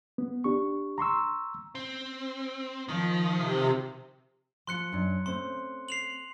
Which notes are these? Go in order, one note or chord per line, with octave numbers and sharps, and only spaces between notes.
B3
D4 G4 C#6
A#5 C6 C#6 E6
C4
D#3 F3
C3
F3 F4 C6 F#6 C#7
F#2 D4
A3 C4 C#4 C6
C7 F7 F#7